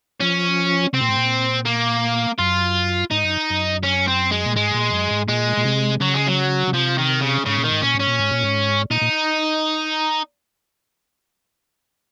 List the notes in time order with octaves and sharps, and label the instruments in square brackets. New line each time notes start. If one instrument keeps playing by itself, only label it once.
[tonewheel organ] F3 [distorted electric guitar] C#4
[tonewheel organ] C3 [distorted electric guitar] C4
[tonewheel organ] A#2
G#2
A#2
[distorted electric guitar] A#3
[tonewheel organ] F#2 [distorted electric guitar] F4
[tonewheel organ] G#2 [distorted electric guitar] D#4
[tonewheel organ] F#2
F#2
[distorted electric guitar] C#4
C4
G#3
[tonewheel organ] A#2
[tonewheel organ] G#2 [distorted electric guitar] G#3
[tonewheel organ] A#2
F#2
G#2
[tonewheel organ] A#2 [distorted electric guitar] G#3
[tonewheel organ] A#2
C3
[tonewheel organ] C#3 [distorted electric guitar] F#3
[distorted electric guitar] G#3
F#3
[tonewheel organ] C#3
[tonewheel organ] C3 [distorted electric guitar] F3
[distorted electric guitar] D#3
C#3
[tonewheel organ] G#2 [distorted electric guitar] C#3
[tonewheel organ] A#2
[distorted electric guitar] D#3
[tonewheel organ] G#2
[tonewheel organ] A#2 [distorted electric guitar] C#4
[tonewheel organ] G#2
[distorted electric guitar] C#4
[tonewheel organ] A#2
G#2
A#2
G#2
[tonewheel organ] A#2 [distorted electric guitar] D#4
[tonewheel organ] A#2